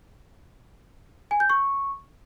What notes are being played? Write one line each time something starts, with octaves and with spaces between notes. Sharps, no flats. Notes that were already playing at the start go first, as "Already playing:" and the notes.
G#5
G6
C#6